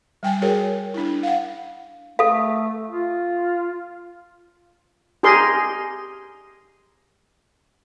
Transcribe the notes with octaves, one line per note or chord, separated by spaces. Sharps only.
G3 G5 G#5
F#4 G#4 A#4 C#5
D4 E4
F5 F#5
A3 A4 F5
F4
G4 G#4 A#4 C6